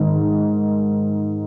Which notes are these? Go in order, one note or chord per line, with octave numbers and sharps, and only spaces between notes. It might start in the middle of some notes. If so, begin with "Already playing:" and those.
Already playing: G#2 D#3